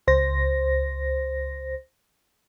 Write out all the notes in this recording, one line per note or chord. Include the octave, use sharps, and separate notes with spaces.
C#2 C5 A#6